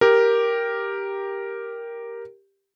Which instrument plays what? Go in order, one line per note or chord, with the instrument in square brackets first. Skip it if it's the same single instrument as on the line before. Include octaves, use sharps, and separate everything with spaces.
[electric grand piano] G4 A#4